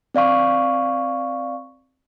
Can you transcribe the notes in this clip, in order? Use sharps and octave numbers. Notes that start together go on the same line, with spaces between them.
C4 D5 F5 C#6